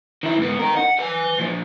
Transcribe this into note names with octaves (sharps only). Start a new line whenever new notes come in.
D#3 E4
G#2 B3
D#4 A#4
F#5
B4 G#5
A#2 F3